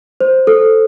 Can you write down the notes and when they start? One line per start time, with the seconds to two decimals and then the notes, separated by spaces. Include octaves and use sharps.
0.21 C5
0.47 A4